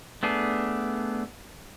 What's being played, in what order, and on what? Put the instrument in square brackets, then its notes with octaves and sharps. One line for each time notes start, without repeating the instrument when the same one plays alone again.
[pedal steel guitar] A3 B3 D4 G#4